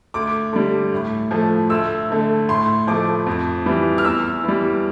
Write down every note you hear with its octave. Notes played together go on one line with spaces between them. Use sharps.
D2 D6
D3 G3
A2
F3 A3
D2 E6
D3 A3
A2 C6
F3 A3 D6
F2
E3 G3
F6
E2 E6
E3 G3